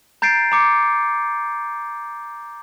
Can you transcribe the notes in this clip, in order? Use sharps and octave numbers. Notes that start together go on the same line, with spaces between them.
A#5 G6 A6 C7 D7
A#5 D6 C#7